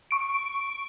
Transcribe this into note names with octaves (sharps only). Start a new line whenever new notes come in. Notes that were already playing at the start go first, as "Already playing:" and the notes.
C#6 D7